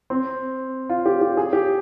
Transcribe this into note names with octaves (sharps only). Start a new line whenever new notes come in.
C4
F4
G4
G4
G#4
G4